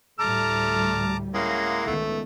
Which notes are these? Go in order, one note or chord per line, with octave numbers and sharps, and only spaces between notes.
D2 A2 G3 A3 A5 A#5 D6 F6
G#3 A#3 C#4 E4 F5 F#5
C#2 D#3 A3 B3